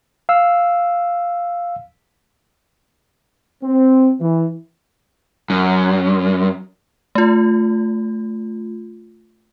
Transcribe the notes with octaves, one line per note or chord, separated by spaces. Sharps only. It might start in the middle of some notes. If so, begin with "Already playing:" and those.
F5 E6
C4
E3
F#2
A3 F4